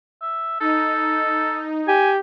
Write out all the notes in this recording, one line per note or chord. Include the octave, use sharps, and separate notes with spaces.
E5
D#4 A4
G4 G#5